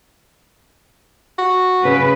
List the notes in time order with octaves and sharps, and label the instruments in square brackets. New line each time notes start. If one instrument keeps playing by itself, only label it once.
[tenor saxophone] F#4
[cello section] C#3 B4